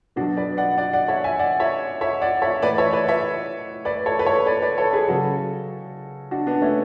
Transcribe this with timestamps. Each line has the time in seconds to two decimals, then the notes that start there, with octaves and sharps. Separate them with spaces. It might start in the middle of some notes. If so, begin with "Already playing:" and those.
0.16 B2 D4 F#4
0.20 F#3
0.37 B4 D5
0.57 D5 F#5
0.78 D5 F#5
0.93 D5 F#5
1.08 C#5 E5
1.24 E5 G#5
1.39 D5 F#5
1.60 C#5 E5
2.01 C#5 E5
2.21 D5 F#5
2.42 C#5 E5
2.62 A2 E3 B4 D5
2.78 C#5 E5
2.93 B4 D5
3.08 C#5 E5
3.85 B4 D5
4.06 A4 C#5
4.19 B4
4.26 A4 C#5
4.46 B4 D5
4.62 B4 D5
4.78 A4 C#5
4.93 G#4 B4
5.08 C#3 F#3 F#4 A4
6.31 D4 F#4
6.47 B3 D4
6.62 A3 C#4